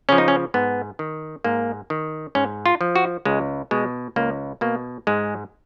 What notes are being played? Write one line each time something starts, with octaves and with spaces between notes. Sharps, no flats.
C#3 F3 C#4
D#4
C#4
G#2 B3
D#3
G#2 A#3
D#3
G#2 C#4
F4
F3
F#4
C#2 G#3
B2 G#3
C#2 A#3
B2 A#3
G#2 G#3